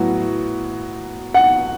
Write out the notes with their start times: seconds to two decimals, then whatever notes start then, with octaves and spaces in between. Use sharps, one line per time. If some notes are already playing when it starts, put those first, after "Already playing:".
Already playing: A2 F#3 B3 F#4
1.34 F#5